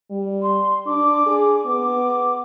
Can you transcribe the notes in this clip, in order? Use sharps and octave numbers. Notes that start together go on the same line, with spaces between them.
G3
C6
D4 D6
G#4
B3 D6